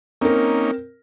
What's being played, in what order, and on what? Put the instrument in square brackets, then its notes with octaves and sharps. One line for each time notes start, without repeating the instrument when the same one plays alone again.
[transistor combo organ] A#3 C#4 D#4 [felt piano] C4 A#4